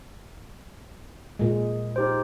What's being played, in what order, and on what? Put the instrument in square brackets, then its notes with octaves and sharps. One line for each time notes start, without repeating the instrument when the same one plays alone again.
[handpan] A#2 G#3
[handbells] D#4 G4 C5